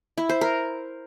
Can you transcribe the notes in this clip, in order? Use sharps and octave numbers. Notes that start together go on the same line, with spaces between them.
E4
C5
A#4